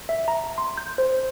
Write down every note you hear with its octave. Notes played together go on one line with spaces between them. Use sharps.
E5
A#5
C6
G6
C5